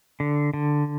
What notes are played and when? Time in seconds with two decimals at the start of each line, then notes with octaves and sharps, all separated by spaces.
0.20 D3
0.54 D3